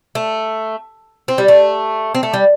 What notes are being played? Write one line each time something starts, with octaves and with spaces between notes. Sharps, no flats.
A3
C4
G3
A3
C4
A3
G3